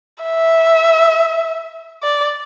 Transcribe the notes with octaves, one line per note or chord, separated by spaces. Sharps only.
E5
D5